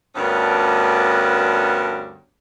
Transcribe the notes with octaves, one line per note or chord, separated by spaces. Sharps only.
D2 G2 B3 C#4 D4 A#4